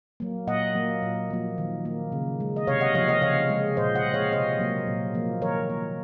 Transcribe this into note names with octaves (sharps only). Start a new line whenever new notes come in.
F#3 A#3
A#2 D#5 F#5
F#3 A#3
A#2
F3 A#3
D#3
A#3
C#3
G#3
D#5
C3 C#5 F5
D#5 F#5
F3 A#3 C#5 F5
D#5 F#5
C#3 C#5 F5
G#3
A#2 C5 D#5
D#5 F#5
G#3
C#5 F5
C3 C5 D#5
F#3 A#3
A#2
F3 A#3
D#3 A#4 C#5
A#3